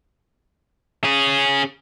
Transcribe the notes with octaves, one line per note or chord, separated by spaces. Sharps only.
C#4 G#4